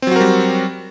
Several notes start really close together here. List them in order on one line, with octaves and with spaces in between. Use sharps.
C4 F#3 F#4 A#4 G3